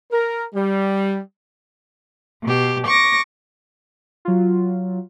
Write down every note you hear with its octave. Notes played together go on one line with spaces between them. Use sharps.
A#4
G3
B2 G4
C#6 D6 A#6
F#3 F4